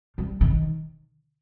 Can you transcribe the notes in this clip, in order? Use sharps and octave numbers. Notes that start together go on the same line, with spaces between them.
G3
D#3